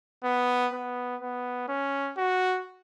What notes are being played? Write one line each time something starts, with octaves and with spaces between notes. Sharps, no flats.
B3
B3
B3
C#4
F#4